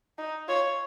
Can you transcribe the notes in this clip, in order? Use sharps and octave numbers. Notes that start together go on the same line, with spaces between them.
D#4
F4 C#5